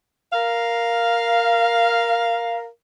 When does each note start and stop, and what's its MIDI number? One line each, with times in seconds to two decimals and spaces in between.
0.32 2.64 70
0.32 2.64 77